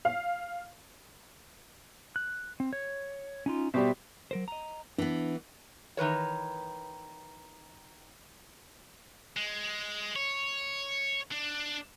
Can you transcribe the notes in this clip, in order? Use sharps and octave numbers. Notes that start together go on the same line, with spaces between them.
F5
F#6
C4
C#5
C#4 D#4 F4
B2 G3 G4 C5 E5
F#3 A#4 C5
D#5 A#5
E3 B3 D4
D#3 E3 B4 C#5
G#3
C#5
D4